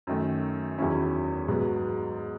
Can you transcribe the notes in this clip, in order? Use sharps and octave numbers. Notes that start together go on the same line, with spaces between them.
F#2 D#3 A3
E2 D#3 F#3 C#4 E4
G#2 F#3 B3